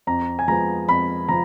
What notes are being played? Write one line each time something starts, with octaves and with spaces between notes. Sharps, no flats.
F2 A#5
G#5
F3 G#3 B3 A#5
F2 B5
F3 A#5